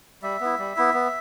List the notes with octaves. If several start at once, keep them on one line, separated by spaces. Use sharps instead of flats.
G3 E5
B3 E4
G3
B3 E4
B3